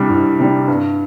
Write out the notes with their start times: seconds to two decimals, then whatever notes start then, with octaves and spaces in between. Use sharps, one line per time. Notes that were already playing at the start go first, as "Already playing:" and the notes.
Already playing: C2 C3 G3 D4
0.10 C2
0.40 C3 G3 D4
0.68 G2